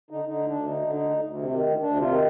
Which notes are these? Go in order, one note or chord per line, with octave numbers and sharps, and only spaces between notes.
D3 D#4
D3 D#4
D2
D2 D4
D3 D#4
D3
D2 D#4
D2
D2
C3
D#3
D2
D2 D4
C3 F4
D#3